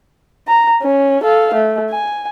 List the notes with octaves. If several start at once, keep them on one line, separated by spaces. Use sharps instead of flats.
A#5
C#4
A4 F5
A3
G#5